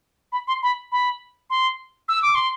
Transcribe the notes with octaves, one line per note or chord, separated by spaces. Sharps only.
B5
C6
B5
B5
C6
E6
D6
C6